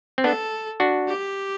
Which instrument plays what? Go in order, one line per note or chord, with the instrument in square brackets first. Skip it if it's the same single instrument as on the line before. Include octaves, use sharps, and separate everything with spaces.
[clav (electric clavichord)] C4
[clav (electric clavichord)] B3 D4 [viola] A4
[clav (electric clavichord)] D4 F#4
[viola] G4